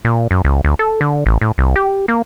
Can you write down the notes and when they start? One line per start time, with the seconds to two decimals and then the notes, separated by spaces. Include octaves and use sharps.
0.05 A#2
0.31 F#2
0.45 C#2
0.64 D2
0.79 A4
1.01 D3
1.26 A1
1.41 A2
1.58 C2
1.76 G4
2.08 A#3